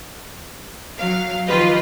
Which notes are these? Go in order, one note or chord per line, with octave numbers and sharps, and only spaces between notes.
F#3 F5
D#3 F3 F4 G4 B4 D#5